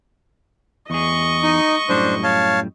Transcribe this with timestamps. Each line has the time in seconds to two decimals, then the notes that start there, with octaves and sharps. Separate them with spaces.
0.90 E2 G#4 D#5 C#6
1.43 D#4
1.89 F#2 A2 G3 D4 C5
2.24 C#5 F5 A5